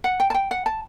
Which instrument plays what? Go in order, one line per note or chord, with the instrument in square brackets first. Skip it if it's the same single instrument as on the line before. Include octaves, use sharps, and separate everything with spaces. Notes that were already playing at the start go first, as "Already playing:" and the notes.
[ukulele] F#5
G5
A5
G5
F#5
A5